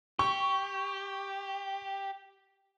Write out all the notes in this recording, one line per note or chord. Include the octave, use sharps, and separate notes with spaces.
G4 C#6